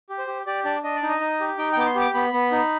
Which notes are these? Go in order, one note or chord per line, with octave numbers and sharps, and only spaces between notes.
G4
C5
G4
G4 D5
D4 D5
D4 D#5
D5
D#4
D#5
D#4
G4
D#4 G5
G5
B3 D6
C6
G4
D6
B3 B5
B3
D#4